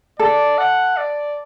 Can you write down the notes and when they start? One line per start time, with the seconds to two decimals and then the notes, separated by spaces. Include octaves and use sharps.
0.19 A4 D5
0.58 F#5
0.97 D5